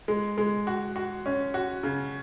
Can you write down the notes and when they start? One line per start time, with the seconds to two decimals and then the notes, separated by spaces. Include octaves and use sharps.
0.08 G#3
0.38 G#3
0.67 F#4
0.96 F#4
1.26 C#4
1.54 F#4
1.83 C#3